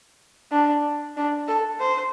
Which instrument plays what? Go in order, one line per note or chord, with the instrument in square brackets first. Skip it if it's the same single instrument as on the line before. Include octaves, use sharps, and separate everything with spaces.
[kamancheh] D4
D4
A4
C5